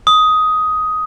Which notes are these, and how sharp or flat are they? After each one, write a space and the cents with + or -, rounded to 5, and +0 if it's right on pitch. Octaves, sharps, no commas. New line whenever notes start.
D#6 +10